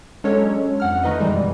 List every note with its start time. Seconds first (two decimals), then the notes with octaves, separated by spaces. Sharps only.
0.24 F#3 G#3 C#4 D4 A4 C#5
0.80 F2 F#5 F6
1.03 D#3 A3 D#4 B4 D#5
1.20 F#2 B2 E3 G3 G#3